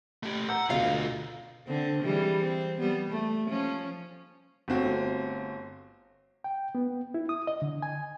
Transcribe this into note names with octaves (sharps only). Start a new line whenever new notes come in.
A3 G4
F#5 A#5 E6 G6
D2 B2 B3 F4 F5
D3 C4
E3 G3 G#3
C4
G3 B3
A3
F3 C#4
G1 A3 C4 F#4
G5
B3
E4
D#6
D#5
D3
G#5